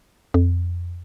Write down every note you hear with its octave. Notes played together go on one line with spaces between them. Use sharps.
F2